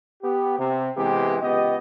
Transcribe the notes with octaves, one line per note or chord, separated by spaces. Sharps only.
B3 G4
C3
C3 E3 G#3 B3 G4
C#2 B3 G4 D#5